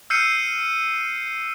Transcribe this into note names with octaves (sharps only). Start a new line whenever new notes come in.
E6 F6 G6 C7 C#7 D#7